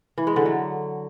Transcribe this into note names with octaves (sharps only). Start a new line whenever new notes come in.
E3
G#3
D3
F#3